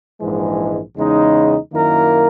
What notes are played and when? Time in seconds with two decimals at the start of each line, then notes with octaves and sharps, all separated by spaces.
0.19 A#1 G#2 E3 G#3
0.96 E2 C#3 G#3 D#4
1.71 F#2 D#3 A#3 E4 A#4